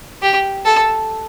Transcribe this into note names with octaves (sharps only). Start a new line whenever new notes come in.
G4
A4